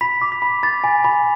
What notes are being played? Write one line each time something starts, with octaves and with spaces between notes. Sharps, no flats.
B5 B6
D6
B6
B5
B5 A6
G#5
B5